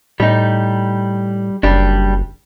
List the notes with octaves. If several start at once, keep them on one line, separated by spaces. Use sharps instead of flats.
A2 G3 D#4
F#1 G3 D4